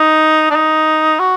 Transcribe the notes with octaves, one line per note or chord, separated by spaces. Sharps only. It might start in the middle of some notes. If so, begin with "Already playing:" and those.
Already playing: D#4
D4
D#4
F#4